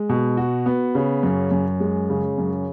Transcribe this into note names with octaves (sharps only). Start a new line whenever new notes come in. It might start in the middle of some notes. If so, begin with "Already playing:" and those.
Already playing: G#3
B2
F#4
B3
C#3
F#2
F#2
G#3
C#3
F#2